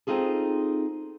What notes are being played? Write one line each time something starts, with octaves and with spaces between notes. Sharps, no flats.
C4 D#4 F4 G#4 A4